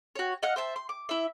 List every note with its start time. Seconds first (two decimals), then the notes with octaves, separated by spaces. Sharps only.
0.15 F#4 C#5
0.43 D#5 F5 F#5 F6
0.56 C5 E5 A5
0.76 C6
0.89 D6
1.09 E4 E5